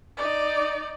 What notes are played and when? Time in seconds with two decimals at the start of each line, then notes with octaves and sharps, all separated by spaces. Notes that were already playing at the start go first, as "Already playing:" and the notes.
0.17 D#4 D5